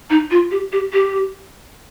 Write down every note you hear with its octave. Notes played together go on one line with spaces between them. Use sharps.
D#4
F4
G4
G4
G4